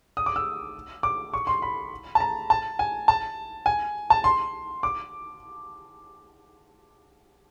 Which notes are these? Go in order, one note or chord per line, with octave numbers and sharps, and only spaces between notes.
D#6
D6
E6
D6
C#6
C6
B5
A5
A#5
A5
G#5
A5
G#5
A5
C6
D6